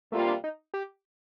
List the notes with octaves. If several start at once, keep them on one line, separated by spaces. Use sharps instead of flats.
D2 C3 G3 A3 A#3 F4
D4
D#4
G4